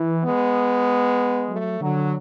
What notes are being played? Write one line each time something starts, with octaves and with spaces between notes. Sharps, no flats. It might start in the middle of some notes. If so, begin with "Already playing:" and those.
Already playing: E3
G#3 B3
F#3 A3
D3 F#3